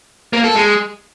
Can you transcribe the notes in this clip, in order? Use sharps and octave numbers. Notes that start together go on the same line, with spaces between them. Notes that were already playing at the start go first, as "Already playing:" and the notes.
A#3
A4
G#3